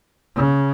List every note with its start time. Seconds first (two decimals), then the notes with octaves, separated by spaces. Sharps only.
0.36 C#3